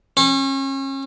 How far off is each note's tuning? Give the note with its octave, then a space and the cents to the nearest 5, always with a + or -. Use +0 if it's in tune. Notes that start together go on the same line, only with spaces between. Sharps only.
C#4 -35